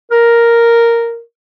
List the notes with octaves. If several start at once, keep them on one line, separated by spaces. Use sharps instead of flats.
A#4